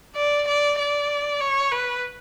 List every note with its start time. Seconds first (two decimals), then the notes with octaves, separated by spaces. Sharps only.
0.16 D5
0.47 D5
0.79 D5
1.41 C#5
1.72 B4